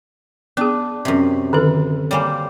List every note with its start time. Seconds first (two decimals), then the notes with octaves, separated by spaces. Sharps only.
0.57 B3 D4 G#4
1.05 F#2 C3
1.53 D3 D#3 A4
2.11 G3 A#3 C5 C#5 G#5